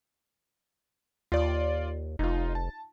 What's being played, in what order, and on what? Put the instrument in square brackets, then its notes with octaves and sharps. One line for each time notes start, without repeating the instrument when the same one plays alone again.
[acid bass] D#2 [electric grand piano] F4 D5
[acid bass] F1 [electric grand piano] D#4 F4
[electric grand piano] A5